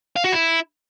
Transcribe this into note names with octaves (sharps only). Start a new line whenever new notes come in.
F5
F#4
E4